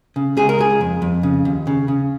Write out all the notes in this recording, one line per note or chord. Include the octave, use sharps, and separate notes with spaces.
C#3
C#2 G#4
A#4
C#2 G#4
F2
F2
C#3
D#2
C#3
C#3